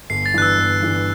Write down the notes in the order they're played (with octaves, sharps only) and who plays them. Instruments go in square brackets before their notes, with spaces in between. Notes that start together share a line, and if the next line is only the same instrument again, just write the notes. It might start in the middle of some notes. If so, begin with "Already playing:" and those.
[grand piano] G1 [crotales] C7
[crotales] A6
[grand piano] G2 E3 [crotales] F#6
[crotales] E6
[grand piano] G1
G2 E3